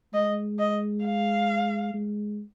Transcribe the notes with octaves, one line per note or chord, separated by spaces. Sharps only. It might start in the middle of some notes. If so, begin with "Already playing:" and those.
G#3 D#5
D#5
F5
G#3